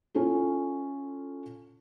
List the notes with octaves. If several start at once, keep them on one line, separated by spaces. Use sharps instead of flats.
C#4 E4 F4 A4